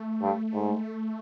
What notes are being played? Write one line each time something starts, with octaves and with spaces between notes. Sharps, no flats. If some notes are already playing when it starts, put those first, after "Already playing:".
Already playing: A3
G2
G#2